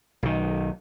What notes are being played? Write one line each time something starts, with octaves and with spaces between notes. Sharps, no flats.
B1 D#3